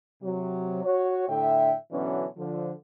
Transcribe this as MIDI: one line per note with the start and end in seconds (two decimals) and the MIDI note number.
0.23 0.84 48
0.23 0.84 54
0.85 1.25 66
0.85 1.25 73
1.29 1.73 45
1.29 1.73 50
1.29 1.73 76
1.29 1.73 79
1.92 2.25 47
1.92 2.25 50
1.92 2.25 52
1.92 2.25 54
1.92 2.25 59
1.92 2.25 61
2.38 2.71 50
2.38 2.71 53